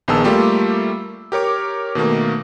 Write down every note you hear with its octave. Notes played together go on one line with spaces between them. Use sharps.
A#1 D#3 B3 G#4 A5 E6
G3 A3 A#3 F4 G4
G4 A#4 C#5 D6
B2 D#3 A3 A#3